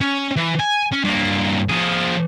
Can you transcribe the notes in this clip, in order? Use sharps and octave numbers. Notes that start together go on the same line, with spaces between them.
C#4
E3
G#5
C#4
G2 A#3
F3 G#4